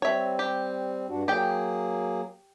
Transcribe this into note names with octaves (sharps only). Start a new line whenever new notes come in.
G3 C4 C#5 E5
G4
G2 D4 F#4
F#3 A#3 G4 G#4 G5